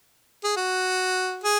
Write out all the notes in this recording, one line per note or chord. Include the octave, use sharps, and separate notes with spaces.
G#4
F#4
G#4